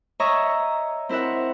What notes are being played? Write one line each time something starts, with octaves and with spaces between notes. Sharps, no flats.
C#5 D#5 E5 A#5 C#6 D#6
C4 E4 A#4 E5 F#5